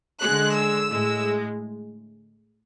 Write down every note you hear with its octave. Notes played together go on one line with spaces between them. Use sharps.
D3 G#3 F#6
E6
A2 G#3